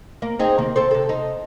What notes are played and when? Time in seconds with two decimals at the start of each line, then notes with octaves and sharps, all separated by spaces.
0.22 A#3
0.39 C4 D#4 G#4
0.58 C3 D#3 A#3
0.76 C4 A4 C5
0.91 C3 A4
1.09 D#4